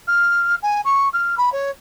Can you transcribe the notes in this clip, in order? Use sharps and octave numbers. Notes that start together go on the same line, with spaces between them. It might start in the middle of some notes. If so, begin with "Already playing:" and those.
F6
G#5
C#6
F6
B5
C#5